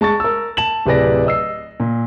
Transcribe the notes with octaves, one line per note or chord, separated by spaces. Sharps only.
G#3 A5 C#6 A6
A#4 E6
A5 E7 F#7
D1 C3 G#4 B4 D5 A#6
D#5 E6 C7
A#2